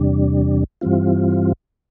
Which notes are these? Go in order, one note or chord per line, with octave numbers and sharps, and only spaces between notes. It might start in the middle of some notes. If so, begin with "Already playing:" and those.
Already playing: E2 C3 G3 D4
G2 E3 G3 C4 F4